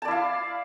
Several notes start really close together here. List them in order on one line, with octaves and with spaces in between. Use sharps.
A5 D5 E4 F5